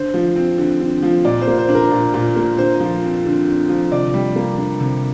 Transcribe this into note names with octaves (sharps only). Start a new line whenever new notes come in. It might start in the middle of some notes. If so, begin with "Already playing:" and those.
Already playing: D3 C5
F3
C4
D3
D3
F3
A#2 D5
C5
A#3
C5
D4
A#4
A#2
A#2
A#3
D3 C5
F3
C4
D3
D3
F3
C3 D5
G3
A#3
D4
C3